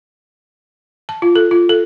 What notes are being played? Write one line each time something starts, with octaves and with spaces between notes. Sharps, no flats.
A5
F4
A4
F4
A4